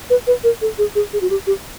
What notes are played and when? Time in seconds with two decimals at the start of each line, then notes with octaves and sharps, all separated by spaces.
0.10 B4
0.27 B4
0.44 A#4
0.61 A4
0.78 G#4
0.95 G#4
1.13 G#4
1.21 F#4
1.30 G4
1.47 G4